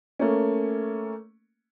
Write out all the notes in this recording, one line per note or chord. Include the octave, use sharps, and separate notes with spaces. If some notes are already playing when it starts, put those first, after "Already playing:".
A3 A#3 C#4